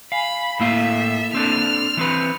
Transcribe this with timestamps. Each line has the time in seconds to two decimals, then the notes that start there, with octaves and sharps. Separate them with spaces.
0.12 F5 G#5 B5
0.60 A2 A#3 E4 A4 E5 F5
1.34 C4 D4 A4 F6
1.97 E3 C4 B4 C#7